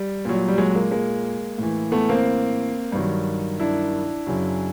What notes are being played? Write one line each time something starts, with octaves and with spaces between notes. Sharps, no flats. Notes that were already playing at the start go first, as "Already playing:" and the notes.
Already playing: G3
A#2 F#3
G3
F#3 G#3
G#3 A#3
G#3 A#3
A2 E3
A3 B3
A#3 C4
G2 D#3 F#3
D4 E4
F#2 C#3 F#3